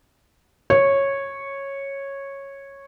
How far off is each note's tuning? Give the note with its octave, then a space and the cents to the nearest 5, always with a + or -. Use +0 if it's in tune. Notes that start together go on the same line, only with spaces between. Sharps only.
C#5 -10